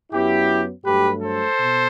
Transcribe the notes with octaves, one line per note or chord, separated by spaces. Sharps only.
F#2 F#3 B3 E4 G4
G2 F#3 A3 G4 B4
A4 C5
B2